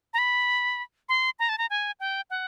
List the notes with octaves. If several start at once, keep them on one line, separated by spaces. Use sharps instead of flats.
A#5
B5
C6
A#5
A5
A#5
G#5
G5
F#5